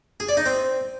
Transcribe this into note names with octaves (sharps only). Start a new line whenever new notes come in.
G#4
D5
D#4
C4